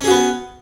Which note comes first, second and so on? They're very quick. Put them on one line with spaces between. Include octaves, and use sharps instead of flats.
C#4 G#4 F#4 B3